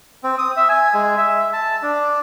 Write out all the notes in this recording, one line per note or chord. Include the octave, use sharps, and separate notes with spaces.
C4
D#6
E5
G#5
G#3
E5
A5
D4